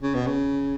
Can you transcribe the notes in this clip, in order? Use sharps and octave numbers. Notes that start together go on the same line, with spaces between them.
C#3
B2
C#3